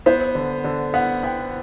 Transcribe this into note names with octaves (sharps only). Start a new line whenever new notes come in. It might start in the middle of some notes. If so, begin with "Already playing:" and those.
B3 C5
D3
D3
B3 F#5
B3 G5